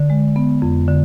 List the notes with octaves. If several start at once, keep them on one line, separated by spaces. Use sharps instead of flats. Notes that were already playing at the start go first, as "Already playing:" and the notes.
Already playing: D3
G#3
B3
F2
D3